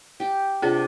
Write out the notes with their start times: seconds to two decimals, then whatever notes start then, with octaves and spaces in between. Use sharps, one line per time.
0.20 G4 G5
0.62 C3 D4 F4 G#4 E5